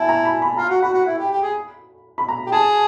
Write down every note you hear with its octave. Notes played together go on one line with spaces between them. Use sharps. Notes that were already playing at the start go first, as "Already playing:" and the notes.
Already playing: E4 G#5 A5
A#5
B5
B5
F4 A#5
F#4
F#4 B5
F#4
E4
G4
G4
G#4
B5
A#5
G4
G#4 A5